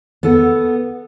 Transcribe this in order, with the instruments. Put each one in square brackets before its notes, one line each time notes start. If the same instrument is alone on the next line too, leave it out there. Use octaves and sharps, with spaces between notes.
[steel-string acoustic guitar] B3 A4 F#5